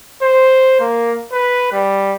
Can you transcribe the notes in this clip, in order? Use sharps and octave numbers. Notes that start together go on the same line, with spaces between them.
C5
A#3
B4
G3